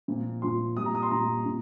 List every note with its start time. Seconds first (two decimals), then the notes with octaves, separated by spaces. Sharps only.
0.08 A#2 F3
0.42 A#2 F3 C6
0.76 A#2 G3 D#6
0.86 A#5
0.95 D#6
1.03 C6
1.11 A#2 G3 A#5
1.46 A#2